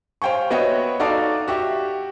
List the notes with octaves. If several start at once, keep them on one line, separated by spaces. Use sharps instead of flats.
C5 F5 G5 G#5 C#6
B3 F#4 C#5 D#5 E5 G5
D#4 F#4 A4 D5 F5 A5
F#4 G4 E5